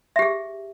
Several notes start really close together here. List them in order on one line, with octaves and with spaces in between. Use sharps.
E5 G4 G#4